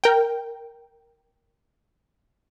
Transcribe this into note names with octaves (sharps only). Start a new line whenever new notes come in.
A#4 G5